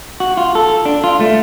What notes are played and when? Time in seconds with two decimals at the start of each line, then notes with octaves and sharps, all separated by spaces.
0.20 F#4
0.37 F4
0.55 A4
0.85 D4
1.04 F4
1.20 A3